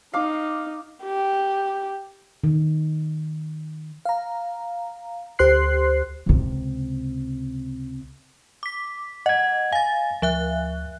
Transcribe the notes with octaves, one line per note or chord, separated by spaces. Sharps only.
D#4 F5 D6
G4
D#3
F5 A#5
D2 G4 C5 C6 F#6 C7
C#2 C3
D6 B6
D#5 F#5 G#6
F5 G#5 A6
D2 F3 E5 F#6